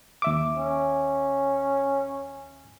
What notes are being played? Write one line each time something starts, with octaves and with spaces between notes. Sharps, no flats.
D#2 E5 D6
C#4